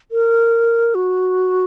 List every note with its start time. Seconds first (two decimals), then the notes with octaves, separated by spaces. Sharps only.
0.12 A#4
0.95 F#4